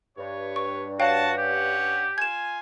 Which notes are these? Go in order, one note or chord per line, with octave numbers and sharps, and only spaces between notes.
G2 B4 C#5
C#6
F#4 C#5 F5 G5 A5
C#4 G4 F#5
F4 G#5 G#6 E7